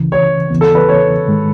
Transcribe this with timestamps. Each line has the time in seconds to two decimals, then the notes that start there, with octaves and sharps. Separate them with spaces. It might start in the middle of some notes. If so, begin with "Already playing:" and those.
Already playing: C#2 C#3 E3
0.12 C#5
0.50 E2 C#3 E3 B3
0.61 A4
0.75 B4
0.89 C#5
1.28 G#2 D#3 G#3